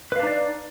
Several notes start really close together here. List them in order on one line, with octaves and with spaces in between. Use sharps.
B4 F5 D4 D#4 D5